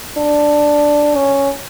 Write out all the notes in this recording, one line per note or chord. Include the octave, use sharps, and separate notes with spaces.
D4
C#4